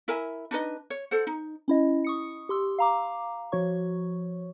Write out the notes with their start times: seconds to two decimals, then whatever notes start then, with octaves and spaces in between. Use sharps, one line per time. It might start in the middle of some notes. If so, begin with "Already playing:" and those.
0.08 E4 A#4 E5 G#5
0.51 D4 D#4 B4 D#5
0.90 C#5
1.11 A4 C5 F#5
1.27 D#4
1.68 C#4 E4 D#5
2.05 C#6 D#6 C#7
2.49 G4 C6 E6
2.79 F5 A#5 D6
3.52 F3 F#4 C#5 C#6